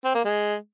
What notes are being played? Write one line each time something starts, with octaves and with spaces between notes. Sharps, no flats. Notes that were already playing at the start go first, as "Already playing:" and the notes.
C4
A#3
G#3